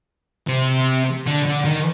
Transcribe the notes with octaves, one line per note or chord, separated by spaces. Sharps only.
C3
D3
D3
D#3